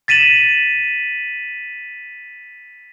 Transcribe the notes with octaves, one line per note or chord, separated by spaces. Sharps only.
A6 B6 D#7 E7 F#7